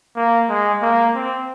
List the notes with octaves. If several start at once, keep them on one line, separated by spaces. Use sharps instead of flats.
A#3
G#3
A#3
C4